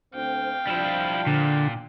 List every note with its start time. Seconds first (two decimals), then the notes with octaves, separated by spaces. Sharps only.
0.14 D2 C4 F5 G5
0.67 F3 G3 D4 E4
1.27 A#2 D3